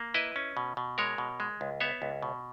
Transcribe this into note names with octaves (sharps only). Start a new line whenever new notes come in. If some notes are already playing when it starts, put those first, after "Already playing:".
Already playing: A#3
E4 B4 D#5
C#4
B2
B2
G#3 A#4 C#5
B2
G#3
C#2
B3 C#5 E5
C#2
B2